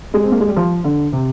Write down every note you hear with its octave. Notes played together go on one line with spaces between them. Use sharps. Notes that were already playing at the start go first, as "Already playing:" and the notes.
G#3
C4
A#3
G#3
G3
F3
D3
C3